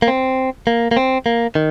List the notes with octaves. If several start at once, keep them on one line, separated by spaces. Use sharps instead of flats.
A#3
C4
A#3
A#3
C4
A#3
D#3